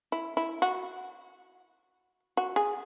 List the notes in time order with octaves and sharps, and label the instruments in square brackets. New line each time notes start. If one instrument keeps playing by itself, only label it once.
[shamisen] E4
E4
F#4
F#4
G#4